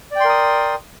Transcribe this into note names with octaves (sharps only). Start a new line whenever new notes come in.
A#4 D5 G5 C6 D#6